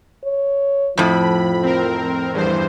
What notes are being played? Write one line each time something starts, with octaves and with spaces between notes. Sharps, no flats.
C#5
F2 A2 F3 B5
C4 A#4
E2 G2 C5